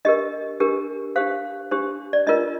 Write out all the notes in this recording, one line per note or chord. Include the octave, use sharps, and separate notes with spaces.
D4 G4 A#4 D#5
D4 G4 A#4
D4 G4 C5 F5
D4 G4 C5
D5
D4 F4 A#4 D#5